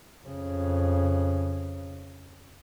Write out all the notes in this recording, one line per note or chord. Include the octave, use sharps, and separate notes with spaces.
F2 C#3